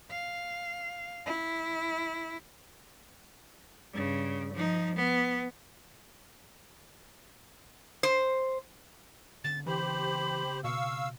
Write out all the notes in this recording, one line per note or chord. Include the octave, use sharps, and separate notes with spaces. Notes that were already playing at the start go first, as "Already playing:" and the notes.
F5
E4
G2 C#3
F3 D#4
B3
C5
C#3 B3 C4 A6
E3 G4 C5 B5
B2 F5 C#6 E6